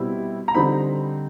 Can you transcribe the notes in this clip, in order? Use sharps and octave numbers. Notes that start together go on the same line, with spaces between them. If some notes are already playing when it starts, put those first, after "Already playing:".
Already playing: B2 G3 C4 E4
A#5
D3 G3 C4 D#4 B5